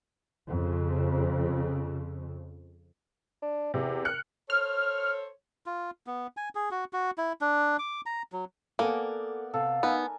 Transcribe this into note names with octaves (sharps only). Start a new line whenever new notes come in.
F2 C#3
D4
E2 C3
F6 F#6 C#7
A4 C5 C#5 F6
F4
B3
G#5
G#4
F#4
F#4
E4
D4
D6
A#5
F#3
A#3 B3 A4 A#4 D5 G#5
C3 A4 F5
B3 D#4 A#4 G#5